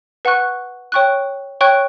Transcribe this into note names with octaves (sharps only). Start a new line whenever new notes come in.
B4 F#5 C#6 F#6
C#5 G5 C#6 F#6
C#5 G5 C#6 F#6